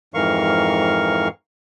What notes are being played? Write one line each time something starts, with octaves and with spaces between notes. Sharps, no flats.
F2 G#2 E3 A#4 F5 C#6